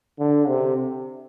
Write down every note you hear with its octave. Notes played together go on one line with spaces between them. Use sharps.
D3
C3